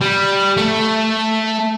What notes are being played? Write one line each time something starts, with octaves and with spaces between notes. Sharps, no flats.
G3
A3